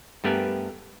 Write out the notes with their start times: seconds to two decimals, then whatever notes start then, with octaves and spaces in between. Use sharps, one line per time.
0.24 G2 A3 B3 G4 A#4 G#5